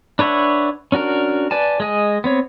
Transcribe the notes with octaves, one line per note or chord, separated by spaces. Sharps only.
D4 B4 C#5 E5 F#5
C#4 D4 F#4 A#4
B4 D5 G#5 A5
G#3 D#5 G#5
B3 C4 C#5